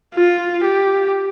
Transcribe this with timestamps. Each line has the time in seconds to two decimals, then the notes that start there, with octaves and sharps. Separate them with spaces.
0.14 F4
0.64 G4